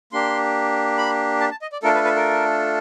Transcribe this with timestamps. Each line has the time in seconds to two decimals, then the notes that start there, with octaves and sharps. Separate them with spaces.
0.12 A#3 D4 G4 C6
0.98 B5
1.40 A5
1.51 A5
1.62 D#5
1.72 D5
1.83 A3 D4 F4 A4 A#4
1.95 B4
2.05 B4
2.16 A#4